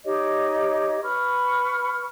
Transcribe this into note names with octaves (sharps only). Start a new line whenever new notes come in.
D#4 G4 C#5 D#5
B4 B5 C#6 F6